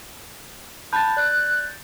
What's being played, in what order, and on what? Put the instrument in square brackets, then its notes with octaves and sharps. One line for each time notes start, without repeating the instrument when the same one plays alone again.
[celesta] A5 B5 F#6 [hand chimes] G6 A6
[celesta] D5 [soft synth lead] F#6